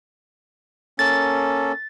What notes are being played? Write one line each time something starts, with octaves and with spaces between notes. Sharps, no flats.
A#3 C#4 A4 A6